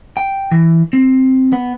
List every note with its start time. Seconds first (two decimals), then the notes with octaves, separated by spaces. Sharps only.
0.17 G5
0.51 E3
0.93 C4
1.53 B3